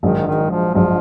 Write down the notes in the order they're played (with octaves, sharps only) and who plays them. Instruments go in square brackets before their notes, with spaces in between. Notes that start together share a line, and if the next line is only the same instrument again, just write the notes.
[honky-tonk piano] A#1 G#2 F#3 [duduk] D#3
[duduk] D#3
F3
[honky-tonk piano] A#1 G#2 F#3 [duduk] F3